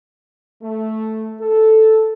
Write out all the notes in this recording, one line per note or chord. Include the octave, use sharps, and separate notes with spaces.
A3
A4